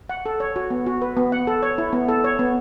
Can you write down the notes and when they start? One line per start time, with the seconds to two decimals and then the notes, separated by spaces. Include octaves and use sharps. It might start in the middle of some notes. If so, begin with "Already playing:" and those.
0.09 F#5
0.26 A4
0.40 C#5
0.56 F#4
0.70 B3
0.86 F#4
1.02 B4
1.17 B3
1.32 F#5
1.47 A4
1.63 C#5
1.78 E4
1.93 B3
2.09 A4
2.24 C#5
2.39 B3